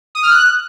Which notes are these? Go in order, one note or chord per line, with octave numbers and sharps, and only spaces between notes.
D#6
F6
F#6